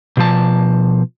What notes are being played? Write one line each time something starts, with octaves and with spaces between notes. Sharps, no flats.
B2 F3 A5